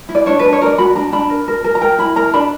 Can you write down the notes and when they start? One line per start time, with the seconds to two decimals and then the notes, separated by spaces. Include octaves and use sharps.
0.09 E4
0.15 D5
0.26 D4 C#5
0.39 B4
0.44 D4
0.52 C#5
0.61 A#4 D5
0.78 F#4 B5
0.95 D4 A#5
1.13 D4 B5
1.30 A#4
1.48 A#4
1.64 A#4
1.75 A#5
1.81 A#4 G5
1.98 E4 B5
2.16 A#4 A#5
2.33 D4 B5